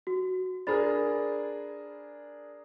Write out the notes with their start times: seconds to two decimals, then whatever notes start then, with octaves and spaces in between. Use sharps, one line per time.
0.07 F#4
0.67 D4 G#4 A#4 C5 B5 A6